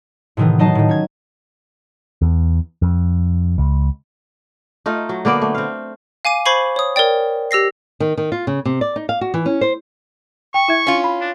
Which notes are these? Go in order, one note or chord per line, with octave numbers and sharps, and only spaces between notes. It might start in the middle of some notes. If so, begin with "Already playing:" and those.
A2 C3 D#3 E3 B3
F#3 D#4 D#5 A5 C7
A2 D#3
C#4 G#6
E2
F2
C#2
A3 D#4 F4
F#3
D3 A#3 B3 D5
A3
C4 F5
F5 G#5 D6 D#7
C5 B5 C#6 G#6 C7 F#7
C#5 D#6
A#4 C#5 D5 G5
G4 E6 A#6 C7
D#3
D#3
F4
C#3
C3
D5
D#4
F5
F#4
E3
C#4
C5
G5 C#6
E4 E5 G#6
C#4 F4
B5
D4